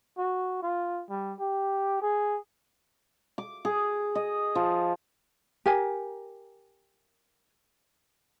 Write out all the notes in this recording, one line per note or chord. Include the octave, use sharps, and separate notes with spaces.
F#4
F4
G3
G4
G#4
D6
G#4
D#5
F3
G4 A#4 G#5